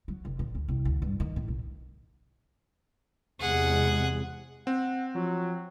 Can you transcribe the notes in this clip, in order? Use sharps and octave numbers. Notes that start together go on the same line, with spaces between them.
F#3
F1
A#2
D2
C2
D2
G2
D#3
A2
B1
E2 C3 G#3 G#4 F#5
C4 F#5
F3 F#3